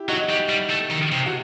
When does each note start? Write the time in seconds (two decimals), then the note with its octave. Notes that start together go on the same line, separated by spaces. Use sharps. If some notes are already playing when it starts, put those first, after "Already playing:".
Already playing: E4 G4
0.08 F#3 D#4 F#4
0.29 G3
0.49 G3
0.70 A3
0.91 D#3
1.12 C3
1.26 F#4